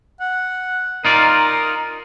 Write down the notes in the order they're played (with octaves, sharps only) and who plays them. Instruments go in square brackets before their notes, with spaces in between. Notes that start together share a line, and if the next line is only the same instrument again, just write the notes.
[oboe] F#5
[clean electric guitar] D#4 F4 D5 [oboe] A#4